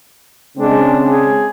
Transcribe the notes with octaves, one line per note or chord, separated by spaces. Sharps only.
C#3 G#3 C4 D4
G#4